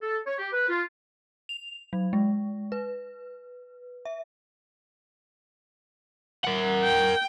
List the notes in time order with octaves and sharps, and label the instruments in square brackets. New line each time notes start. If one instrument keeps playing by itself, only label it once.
[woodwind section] A4
C#5
G4
B4
F4
[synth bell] F7
F#3
G#3
B4
E5
[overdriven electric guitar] A#4 F#5
[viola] G5